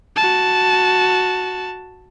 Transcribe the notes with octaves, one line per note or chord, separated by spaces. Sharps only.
F#4 A5